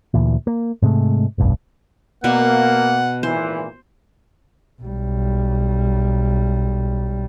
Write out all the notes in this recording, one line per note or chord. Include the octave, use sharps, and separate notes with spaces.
D2 A#2 E3
A#3
G#2 C3 G#3 A3
F1 B1 G2
B2 A#3 D5 F#5 C#6
G#1 A#2 E3 C5
B1 G3